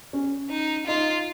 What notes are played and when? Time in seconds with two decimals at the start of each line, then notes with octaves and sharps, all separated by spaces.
0.13 C#4
0.50 D#4
0.87 D#4 F4